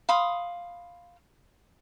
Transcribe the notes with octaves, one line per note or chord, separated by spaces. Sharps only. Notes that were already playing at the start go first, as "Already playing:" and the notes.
F5 B5 C6 D#6